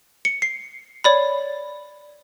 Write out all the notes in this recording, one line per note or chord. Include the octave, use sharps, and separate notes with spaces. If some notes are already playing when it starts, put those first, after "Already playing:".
C#7
C7
C#5 D5 B5